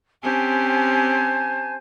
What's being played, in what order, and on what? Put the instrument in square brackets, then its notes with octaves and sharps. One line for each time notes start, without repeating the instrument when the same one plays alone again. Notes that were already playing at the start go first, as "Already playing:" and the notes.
[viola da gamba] C4 C#4 G4 [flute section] C5 G#5 A5